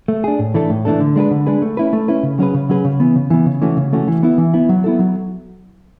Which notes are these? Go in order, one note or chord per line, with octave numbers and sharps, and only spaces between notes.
A3
D4 G#4
A2
E3 A3 D4 A4
A2
E3 A3 D4 A4
D3
G#3 D4 G#4 B4
D3
G#3 D4 G#4 B4
A3
C#4 E4 B4
A3
C#4 E4 B4
C#3
F#3 C#4 G#4 B4
C#3
F#3 C#4 G#4 B4
C#3
E3 B3
C#3
E3 B3
C#3
E3 A3 C#4 F#4
C#3
E3 A3 C#4 F#4
E3
B3 E4
E3
B3 E4
F#3
B3 E4 A4
F#3